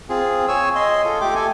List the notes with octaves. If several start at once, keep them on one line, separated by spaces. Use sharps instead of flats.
C4 F4 G#4
C#5 G#5 E6
D#5 G#5 C6
F4 A4
A3 G4 G5 D6
A4 G#5